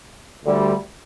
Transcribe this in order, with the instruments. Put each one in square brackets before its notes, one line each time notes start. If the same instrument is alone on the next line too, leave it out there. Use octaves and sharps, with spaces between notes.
[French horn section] D2 D3 G3